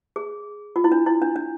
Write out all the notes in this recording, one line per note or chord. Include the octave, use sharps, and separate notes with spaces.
G#4
F4
E4
D4
E4
D4
D4